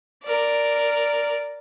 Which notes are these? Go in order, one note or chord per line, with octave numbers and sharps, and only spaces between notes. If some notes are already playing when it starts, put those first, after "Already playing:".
A#4 D5